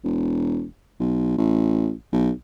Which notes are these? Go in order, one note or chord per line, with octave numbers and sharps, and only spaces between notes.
E1
B1
A1
B1